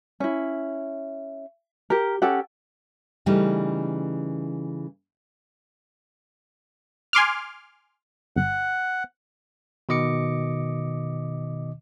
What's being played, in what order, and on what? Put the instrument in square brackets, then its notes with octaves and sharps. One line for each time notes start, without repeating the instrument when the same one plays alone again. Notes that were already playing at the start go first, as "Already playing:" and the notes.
[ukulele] C#4 E4
G4 A#4
C#4 G4 A4 F#5
[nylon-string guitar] C#3 E3 G3 A3 D#4
[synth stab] G#5 C6 D6 F6
[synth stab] G1 [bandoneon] F#5
[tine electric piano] B2 D#3 D#5 D6 C#7